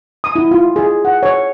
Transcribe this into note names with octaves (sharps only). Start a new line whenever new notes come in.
D#6
E4
F4
G#4
F#5
C#5